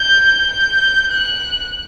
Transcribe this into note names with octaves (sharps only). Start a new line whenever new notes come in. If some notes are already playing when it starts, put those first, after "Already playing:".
Already playing: G6
G6
F#6